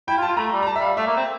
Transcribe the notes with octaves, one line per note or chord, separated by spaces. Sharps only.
E4 G5
F4
A5
F4
A3 A#5
G3
A#5
A5
E5
G3 F5
A3 E5
A#3
C4